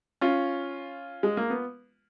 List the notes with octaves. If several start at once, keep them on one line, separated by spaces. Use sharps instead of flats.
C#4 F4
G#3
A#3
B3